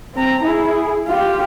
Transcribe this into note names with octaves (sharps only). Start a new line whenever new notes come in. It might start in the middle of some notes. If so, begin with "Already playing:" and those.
C4 A#5
E4 G#4
F4 G4